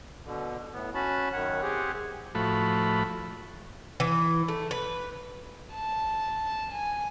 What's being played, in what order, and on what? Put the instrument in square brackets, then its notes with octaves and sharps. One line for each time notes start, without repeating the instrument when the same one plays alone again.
[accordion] B2 D3
A2 B3
C#4 F#4 A5 B5
F#2 D#3 C#5 F#5
C4 G4 G#4 F#5
[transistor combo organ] A2 F3 A3 F#4 B5
[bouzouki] E3
A3
B4
[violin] A5
G#5